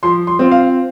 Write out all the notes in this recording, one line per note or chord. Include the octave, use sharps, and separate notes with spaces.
F3 C6
C6
C4 F4
F5